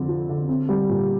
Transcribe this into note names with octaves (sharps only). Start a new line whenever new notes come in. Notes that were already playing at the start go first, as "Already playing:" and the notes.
Already playing: F2 D3 C4
F3
D3
C4
G3
A#2